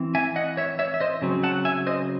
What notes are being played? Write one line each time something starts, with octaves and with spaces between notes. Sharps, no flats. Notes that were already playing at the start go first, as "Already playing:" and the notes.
Already playing: E3 C4
E5 G#5
D#5 F#5
C#5 E5
C#5 E5
E5
C5 D#5
C#3 F#3 C4
F#5 A5
E5 G#5
C5 D#5